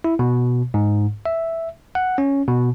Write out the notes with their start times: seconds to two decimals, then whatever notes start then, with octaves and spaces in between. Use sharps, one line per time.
0.04 E4
0.19 B2
0.74 G#2
1.26 E5
1.95 F#5
2.18 C#4
2.48 B2